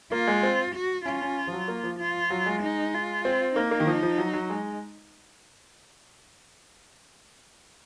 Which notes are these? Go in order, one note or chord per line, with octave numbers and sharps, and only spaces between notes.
A#3 F4
G#3
C4
F#4
C#4 F4
C#4
F3
F#3
A#3
F3
F4
F#3
G#3
D#4
F4
C4
A#3 D#4
A#3
D#3
F3
F3
F#3
F#3
G#3